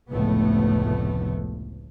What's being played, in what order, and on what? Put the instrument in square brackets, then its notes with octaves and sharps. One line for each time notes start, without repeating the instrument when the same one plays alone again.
[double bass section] F1 C#2 A2 A3 B3